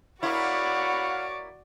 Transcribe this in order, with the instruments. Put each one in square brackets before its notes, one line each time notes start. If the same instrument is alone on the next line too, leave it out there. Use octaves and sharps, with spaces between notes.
[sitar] A#3 E4 [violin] F#4 D5 [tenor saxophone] C#5 [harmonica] F5 F#5 B5